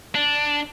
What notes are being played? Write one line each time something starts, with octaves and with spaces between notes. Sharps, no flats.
D4